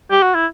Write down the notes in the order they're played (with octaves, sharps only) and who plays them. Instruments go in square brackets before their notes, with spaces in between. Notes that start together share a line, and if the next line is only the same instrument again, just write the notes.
[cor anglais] G4
F#4
E4